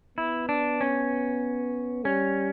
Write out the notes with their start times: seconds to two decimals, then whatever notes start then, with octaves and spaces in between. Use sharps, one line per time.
0.18 B3 E4
0.49 D4
0.81 C#4
2.05 G3 C#4